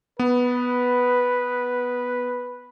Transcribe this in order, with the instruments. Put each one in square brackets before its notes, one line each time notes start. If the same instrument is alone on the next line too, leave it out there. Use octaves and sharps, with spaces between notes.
[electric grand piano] B3 [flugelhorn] B4